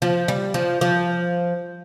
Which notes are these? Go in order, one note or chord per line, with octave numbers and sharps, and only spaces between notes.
F3
G3
F3
F3